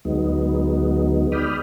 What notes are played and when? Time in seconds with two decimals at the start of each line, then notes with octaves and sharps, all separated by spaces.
0.05 D2 F#3 G#3 B3 D#4
1.32 D5 G5 B5 D#6 F6